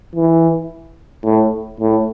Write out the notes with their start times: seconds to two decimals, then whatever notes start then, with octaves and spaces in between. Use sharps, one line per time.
0.15 E3
1.25 A2
1.80 A2